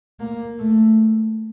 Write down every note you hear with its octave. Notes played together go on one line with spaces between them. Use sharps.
A#3
A3